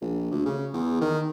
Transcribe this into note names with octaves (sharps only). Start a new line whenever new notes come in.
A#1
D2
C#3
E2
D#3